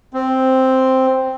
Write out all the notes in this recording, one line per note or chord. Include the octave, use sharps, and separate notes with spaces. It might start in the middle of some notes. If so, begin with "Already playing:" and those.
C4